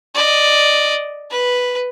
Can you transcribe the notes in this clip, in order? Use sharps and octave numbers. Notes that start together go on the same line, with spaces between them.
D5 D#5
B4